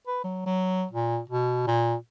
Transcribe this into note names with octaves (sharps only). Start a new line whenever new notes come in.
B4
F#3
F#3
A#2
B2
A#2